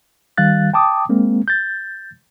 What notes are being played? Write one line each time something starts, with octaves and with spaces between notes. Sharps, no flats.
D#3 G3 F5 F#6 A6
G5 A5 D6 D#6
G#3 A#3 C4
G6 A6